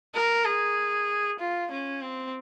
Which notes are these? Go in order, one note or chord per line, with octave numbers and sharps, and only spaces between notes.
A#4
G#4
F4
C#4
C4